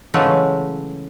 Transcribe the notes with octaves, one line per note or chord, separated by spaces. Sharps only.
C#3 E3 F#3 G#3 A3